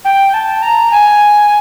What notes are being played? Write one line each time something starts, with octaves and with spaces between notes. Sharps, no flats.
G5
A5
A#5
G#5